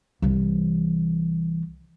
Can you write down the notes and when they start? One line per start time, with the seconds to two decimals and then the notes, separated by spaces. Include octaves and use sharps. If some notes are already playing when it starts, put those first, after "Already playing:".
0.22 C2 E3